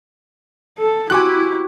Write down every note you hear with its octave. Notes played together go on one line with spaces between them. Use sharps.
A4
C4 E4 F#4 G4 G#5 D6 F#6